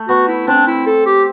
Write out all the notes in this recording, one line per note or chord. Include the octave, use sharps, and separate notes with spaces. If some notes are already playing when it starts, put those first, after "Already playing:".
Already playing: A3
B3 F#4
E4
C4 D4
E4
A4
G4